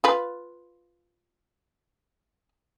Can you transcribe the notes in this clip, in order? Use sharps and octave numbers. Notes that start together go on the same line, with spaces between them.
F4 B4